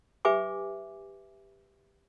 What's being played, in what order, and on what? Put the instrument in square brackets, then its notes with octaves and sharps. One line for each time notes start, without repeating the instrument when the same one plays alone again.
[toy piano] G4 B4 E5 G#5 D6